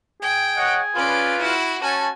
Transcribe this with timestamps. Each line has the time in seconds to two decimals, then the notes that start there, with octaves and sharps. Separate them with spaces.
0.22 G#4 G5
0.57 C#5 D#5 F#5
0.95 C#4 F4 B4 D5
1.40 E4 F#4
1.82 C#4 F#4 G#5 A5